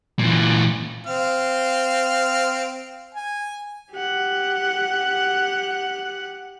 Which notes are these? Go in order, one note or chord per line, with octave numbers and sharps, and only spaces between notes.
A#2 E3
C4 F5
G#5
G4 F#5